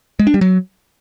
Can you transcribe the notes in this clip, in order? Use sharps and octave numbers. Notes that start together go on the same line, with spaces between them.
G#3
D4
G3
F#3